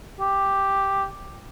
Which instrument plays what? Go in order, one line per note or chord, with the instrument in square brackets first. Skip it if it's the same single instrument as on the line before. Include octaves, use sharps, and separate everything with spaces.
[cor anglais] G4